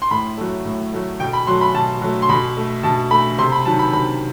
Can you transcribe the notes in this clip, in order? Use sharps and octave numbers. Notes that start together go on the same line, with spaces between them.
C6
A2 B5
F#3 A3
A2
F#3 A3
B2 G5
B5
F#3 A3 C6
B5
B2 A5
F#3 A3
C6
B2 B5
A3
B2 A5
A3 B5
C3 C6
B5
D#3 F#3 A5
B5
C3 B5